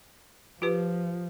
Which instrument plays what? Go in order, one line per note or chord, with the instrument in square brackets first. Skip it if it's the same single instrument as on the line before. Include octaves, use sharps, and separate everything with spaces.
[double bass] F3 [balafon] F4 G4 B4